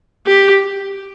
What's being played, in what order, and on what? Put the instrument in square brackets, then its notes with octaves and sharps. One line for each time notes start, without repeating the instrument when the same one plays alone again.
[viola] G4